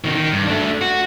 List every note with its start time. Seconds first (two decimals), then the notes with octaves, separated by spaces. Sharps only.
0.04 B2 D#3
0.16 D#3
0.32 G2
0.47 A3 D4
0.81 F#4